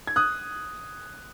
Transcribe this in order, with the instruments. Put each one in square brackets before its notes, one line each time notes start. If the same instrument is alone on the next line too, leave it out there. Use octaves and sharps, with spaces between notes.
[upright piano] G#6
D#6 F#6